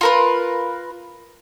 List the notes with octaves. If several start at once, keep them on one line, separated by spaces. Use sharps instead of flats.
F4 A#4 B4